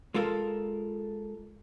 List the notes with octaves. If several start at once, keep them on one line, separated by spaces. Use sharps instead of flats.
G#3 F4 A4 A#4